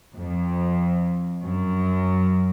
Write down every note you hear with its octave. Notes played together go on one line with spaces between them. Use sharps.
F2
F#2